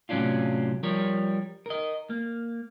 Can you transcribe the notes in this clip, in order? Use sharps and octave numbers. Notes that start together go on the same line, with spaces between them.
A2 C3 F#3 C#4 D4 F4
F3 G3 A#4 C#5
A#4 D#5
A#3